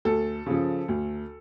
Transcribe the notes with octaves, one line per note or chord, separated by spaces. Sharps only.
D2 A4
C#3 F3
D2